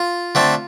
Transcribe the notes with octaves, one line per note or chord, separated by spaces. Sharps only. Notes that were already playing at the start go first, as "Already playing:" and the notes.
Already playing: F4
D3 A3 C4